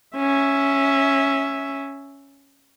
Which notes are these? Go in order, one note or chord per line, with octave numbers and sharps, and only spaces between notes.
C#4 E5